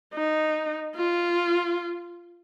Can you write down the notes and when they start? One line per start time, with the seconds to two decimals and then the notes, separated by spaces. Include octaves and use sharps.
0.14 D#4
0.96 F4